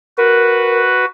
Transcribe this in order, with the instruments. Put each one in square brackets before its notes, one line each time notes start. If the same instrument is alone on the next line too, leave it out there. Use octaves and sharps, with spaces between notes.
[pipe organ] F#4 B4 [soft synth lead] A#4